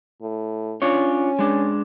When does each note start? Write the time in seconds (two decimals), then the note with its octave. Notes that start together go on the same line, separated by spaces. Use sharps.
0.22 A2
0.82 C#4 D4 F4 C#5
1.39 G#3 D4